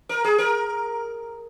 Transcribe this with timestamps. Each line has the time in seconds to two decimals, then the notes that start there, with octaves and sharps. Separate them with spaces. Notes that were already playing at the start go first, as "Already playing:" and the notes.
0.09 A#4
0.24 G#4
0.38 A#4